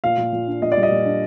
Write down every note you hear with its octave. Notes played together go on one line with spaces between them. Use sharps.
A#2 F5
A#2
A#2
D4
A#2 D#5
D5
G3
D#5
A#2
D4